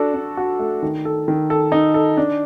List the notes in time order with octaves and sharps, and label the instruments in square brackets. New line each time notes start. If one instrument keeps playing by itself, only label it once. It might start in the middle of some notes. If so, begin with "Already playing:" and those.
Already playing: [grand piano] D4 F#4 A4
D4
F#4
A3
D#3
A4
D#3
A4
D#4
A4
D4